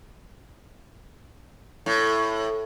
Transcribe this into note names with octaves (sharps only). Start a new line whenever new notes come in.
A2